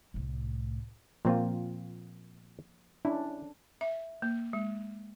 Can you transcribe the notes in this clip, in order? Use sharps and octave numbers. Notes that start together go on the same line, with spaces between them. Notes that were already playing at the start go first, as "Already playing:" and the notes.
C2 A2
A#2 F3 A#3 C4 F4
C#4 D4 E4
E5
A#3
G#3